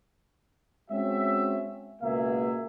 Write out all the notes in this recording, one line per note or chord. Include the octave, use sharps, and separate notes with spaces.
G#3 C4 C#4 F#4 E5
C#2 B2 A#3 B3 G#4 E5